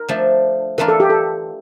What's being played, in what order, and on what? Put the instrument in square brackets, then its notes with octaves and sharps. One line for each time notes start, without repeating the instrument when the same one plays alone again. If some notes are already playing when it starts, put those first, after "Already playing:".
Already playing: [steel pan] A#4
[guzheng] F3 A3 D4
[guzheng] E3 A3 D4 F4 [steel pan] A#4
[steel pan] A4
G4
A4